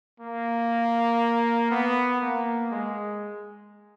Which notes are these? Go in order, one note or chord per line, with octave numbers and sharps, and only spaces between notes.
A#3
B3
A#3
G#3